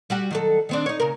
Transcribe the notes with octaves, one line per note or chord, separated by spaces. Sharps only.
G3 F#4 G4
D#3 F#3 A4
D#3 C4 D4
D#4 C#5
C#3 A#4